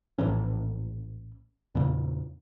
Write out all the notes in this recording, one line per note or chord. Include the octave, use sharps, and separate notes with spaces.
A#1 A2 E3 C#4
E2 A#2 C#3